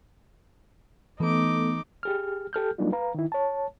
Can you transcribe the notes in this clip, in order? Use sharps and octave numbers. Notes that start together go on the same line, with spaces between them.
E3 A3 B3 D#4 A4 D6
G4 G#4 F6
G4 A4 F6 G6
F#3 G3 A#3 D4 D#4 F4
B4 F5 A#5
D#3 E4
C#5 A5